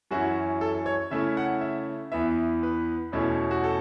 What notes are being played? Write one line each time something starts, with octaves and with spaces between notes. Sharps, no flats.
F#2 E3 C#4 E4 F#4
A4
C#5
C#3 A3 C#4 E4 E5
F#5
E5
E2 E3 B3 E5
B4
E2 B2 A3 C#4 E4
F#4
A4